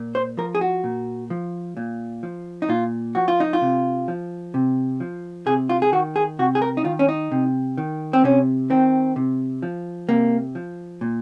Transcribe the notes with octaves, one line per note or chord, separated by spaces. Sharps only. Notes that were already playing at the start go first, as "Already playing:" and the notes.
Already playing: A#2
C5
F3 A#4
G#4
F#4
A#2
F3
A#2
F3
D#4
A#2 F4
F3 F#4
F4
D#4
F4
C3
F3
C3
F3
C3 G#4
F4
G#4
D#3 F#4
G#4
C3 F#4
G#4
A#4
D#4
D#3 F4
C#4
D#4
C3
D#3
C4
C3 C#4
D#3 C4
C3
F3
C3 A#3
F3
A#2